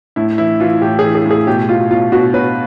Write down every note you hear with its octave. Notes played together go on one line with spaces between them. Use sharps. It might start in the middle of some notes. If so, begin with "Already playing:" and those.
A2 E4
E3 E4
E3 F4
A2 G4
G#4
E3
G#4
A2
G#4
B2 G4
B2 F4
B2 F4
B2 F#4
B2 B4